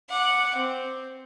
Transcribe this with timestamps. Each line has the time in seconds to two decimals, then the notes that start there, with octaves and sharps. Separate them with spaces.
0.10 F#5 D6
0.56 C4